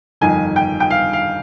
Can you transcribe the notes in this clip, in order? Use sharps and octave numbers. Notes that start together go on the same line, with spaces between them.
G1 F2 D#3 G#5
G5
G5
F5
F5